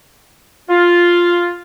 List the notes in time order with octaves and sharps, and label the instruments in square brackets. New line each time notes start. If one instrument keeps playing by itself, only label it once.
[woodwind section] F4